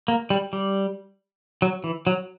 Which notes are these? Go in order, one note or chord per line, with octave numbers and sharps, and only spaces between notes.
A#3
G3
G3
F#3
E3
F#3